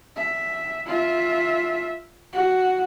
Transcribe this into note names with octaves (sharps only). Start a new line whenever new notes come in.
E5
F4 E5
F#4